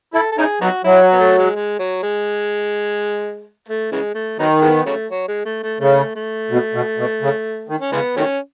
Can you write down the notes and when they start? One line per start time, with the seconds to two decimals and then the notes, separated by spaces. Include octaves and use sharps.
0.14 E4 A4
0.32 A4
0.38 C#4 D#4 E4 G#4
0.61 F#3 B3 D#4 F#4
0.84 F#3 E4
1.03 F#4
1.12 B3
1.20 A3
1.38 G#3
1.55 G#3
1.79 F#3
2.03 G#3
3.68 A3
3.92 C#3 E3 G#3
4.14 A3
4.39 D#3 F#3 B3 D#4
4.62 E3 G#3 B3
4.86 C#3 F#3 A3
5.10 F#3
5.28 G#3
5.45 A3
5.63 A3
5.80 C#3 A3
6.16 A3
6.51 B2
6.74 B2
6.98 B2
7.22 C#3
7.69 D#3
7.81 C#4
7.92 C#3 E3 G#3 B3
8.16 D#3 F#3 A3 C#4